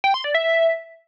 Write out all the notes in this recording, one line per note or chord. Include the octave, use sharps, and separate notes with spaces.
G5
C6
D5
E5